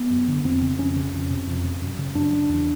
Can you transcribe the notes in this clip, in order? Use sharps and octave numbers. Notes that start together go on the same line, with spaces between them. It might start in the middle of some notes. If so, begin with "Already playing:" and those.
Already playing: B3
F#2
D3
F2 C4
C#3
F2 C#4
C#3
F2
C3
F2
C3
F#2
C#3
F#2 D4
C#3
E2